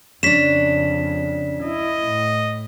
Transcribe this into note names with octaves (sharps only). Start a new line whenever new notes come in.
F2 C#3 C#4 D4 B6 E7
E4 D#5
A2